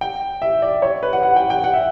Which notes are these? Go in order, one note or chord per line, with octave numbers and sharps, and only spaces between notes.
G5
E5
D5
C#5
B4
F#5
F#5
G5
G5
F#5
E5